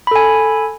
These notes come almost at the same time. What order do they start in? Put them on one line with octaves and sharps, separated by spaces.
B5 A4 G#5